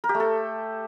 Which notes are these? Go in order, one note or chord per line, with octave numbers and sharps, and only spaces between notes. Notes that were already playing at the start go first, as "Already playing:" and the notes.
A#4
G4
A3
A4